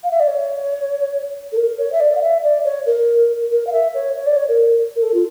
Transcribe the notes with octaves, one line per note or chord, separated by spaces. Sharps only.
F5
E5
D5
C#5
A4
A#4
C#5
E5
D5
F5
E5
D5
C#5
A#4
A#4
F5
E5
C#5
C#5
D5
C#5
A#4
A#4
A4
F4